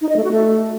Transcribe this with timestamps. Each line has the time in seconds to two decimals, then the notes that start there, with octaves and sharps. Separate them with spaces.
0.01 D#4
0.09 D#5
0.16 A3
0.24 F#4
0.32 A3